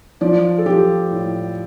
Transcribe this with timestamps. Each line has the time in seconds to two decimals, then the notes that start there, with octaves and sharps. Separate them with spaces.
0.21 F3 D5
0.58 A4
0.66 F3 G4
1.11 A2